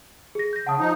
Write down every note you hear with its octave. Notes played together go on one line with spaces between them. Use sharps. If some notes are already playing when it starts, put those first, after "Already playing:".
G#4 A#6
G6 A#6
C#3 F#5 A5 D#6
F3 D#4